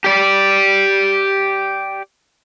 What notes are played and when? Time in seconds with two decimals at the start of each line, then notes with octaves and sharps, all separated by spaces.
0.04 G4 D5